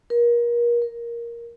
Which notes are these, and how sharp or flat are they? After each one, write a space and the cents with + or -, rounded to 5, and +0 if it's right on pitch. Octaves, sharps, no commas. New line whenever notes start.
A#4 +30
A#4 +10